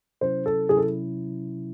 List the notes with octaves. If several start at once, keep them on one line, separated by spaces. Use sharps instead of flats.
C3 F#3 C#4 E4 C5
A4
C3 F#3 C#4 E4 G#4
A4